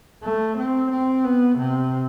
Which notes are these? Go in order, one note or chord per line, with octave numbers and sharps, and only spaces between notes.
A3
C4
C4
B3
C3